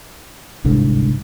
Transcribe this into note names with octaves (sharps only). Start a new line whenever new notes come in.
G1 C2 G#2 D3